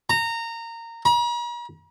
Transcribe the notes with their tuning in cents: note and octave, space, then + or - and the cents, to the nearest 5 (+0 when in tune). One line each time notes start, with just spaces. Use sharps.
A#5 -20
A#5 +45